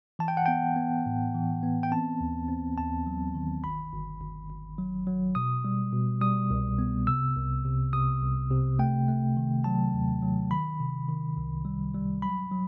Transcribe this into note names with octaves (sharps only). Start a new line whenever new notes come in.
E3 A5
G5
F#5
B3 G5
B3
A2
E3
B3
G5
C4 A5
D#2
C4
D#2 A5
F#3
D#3
G1 B5
G1
G1
G1
F#3
F#3
B2 D#6
G3
B2
G3 D#6
C2
B3
C3 E6
C2
C3
C3 D#6
C2
C3
A3 G5
A3
D#3
F#3 A5
D#2
F#3
D#3 B5
C3
D#3
C2
G3
G3
F#3 B5
F#3